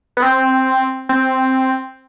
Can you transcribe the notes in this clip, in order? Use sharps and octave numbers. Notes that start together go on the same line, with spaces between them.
B3
C4
C4